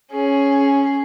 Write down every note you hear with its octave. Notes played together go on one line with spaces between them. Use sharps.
C#4 G#4